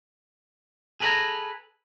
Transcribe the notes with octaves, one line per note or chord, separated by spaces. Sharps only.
G#4 A4 B4 D5 G#5 A#5